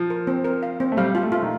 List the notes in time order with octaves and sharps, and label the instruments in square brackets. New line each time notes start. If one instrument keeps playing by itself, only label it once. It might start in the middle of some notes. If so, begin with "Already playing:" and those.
Already playing: [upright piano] F3
[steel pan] A#4
C4
A#4
F5
C4
[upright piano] A3
[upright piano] G3 [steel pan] F5
[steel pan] F4
[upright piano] A3
[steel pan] F4
[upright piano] D#3